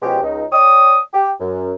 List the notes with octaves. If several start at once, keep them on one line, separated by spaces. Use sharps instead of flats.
B2 F3 G#3 C#4 G4
C#2 D#4
C#5 D5 G5 D#6
G4
F#2